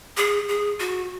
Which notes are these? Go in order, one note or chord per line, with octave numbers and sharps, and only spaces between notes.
G#4
G#4
F#4